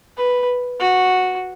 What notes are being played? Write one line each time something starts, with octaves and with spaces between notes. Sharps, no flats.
B4
F#4